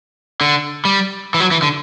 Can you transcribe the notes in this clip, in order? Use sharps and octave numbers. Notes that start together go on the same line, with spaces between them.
D3
G3
E3
F#3
E3
D3